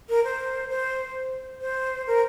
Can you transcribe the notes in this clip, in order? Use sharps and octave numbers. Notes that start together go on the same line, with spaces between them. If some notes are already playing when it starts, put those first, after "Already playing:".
A#4
C5
C5
C5
A#4